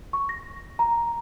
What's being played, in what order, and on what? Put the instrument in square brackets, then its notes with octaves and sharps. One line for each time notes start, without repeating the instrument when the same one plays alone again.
[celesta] C#6
A#6
A#5